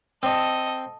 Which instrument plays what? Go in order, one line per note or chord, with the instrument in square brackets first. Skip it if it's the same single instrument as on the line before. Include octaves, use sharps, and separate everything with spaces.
[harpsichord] C4 [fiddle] A4 D#5